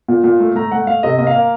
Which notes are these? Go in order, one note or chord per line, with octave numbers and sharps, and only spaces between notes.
A#2
A#2
A3
A3 A#5
A3 F#5
A3 F5
C3 D#5
A#3 D#5
F5
A#3